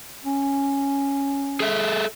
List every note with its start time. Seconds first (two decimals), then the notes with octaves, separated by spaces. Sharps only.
0.24 C#4
1.60 G#4 A4 E5